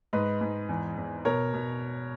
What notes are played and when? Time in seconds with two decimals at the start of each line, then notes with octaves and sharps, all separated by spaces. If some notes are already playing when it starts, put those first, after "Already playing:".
0.13 G#2 B4 D#5
0.41 G#2
0.69 E2
0.97 E2
1.25 B2 A#4 C#5
1.54 B2